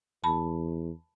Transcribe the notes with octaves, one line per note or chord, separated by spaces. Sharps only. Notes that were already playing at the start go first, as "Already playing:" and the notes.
E2 A5 B5